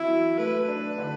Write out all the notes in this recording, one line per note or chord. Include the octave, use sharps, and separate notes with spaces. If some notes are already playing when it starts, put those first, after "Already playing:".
Already playing: E3 C4 E4 F#4
F#3
A3 B4
D4
D3